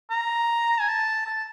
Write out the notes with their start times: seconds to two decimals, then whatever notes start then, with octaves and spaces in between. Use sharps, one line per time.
0.10 A#5
0.80 G#5
0.89 A5
1.26 A5